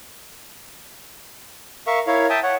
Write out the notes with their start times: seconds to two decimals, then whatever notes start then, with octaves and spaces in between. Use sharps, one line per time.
1.87 A#4 E5 F5 C#6
2.07 E4 A#4 C#5 F5
2.30 E5 G5 A5 D#6
2.43 C#5 F#5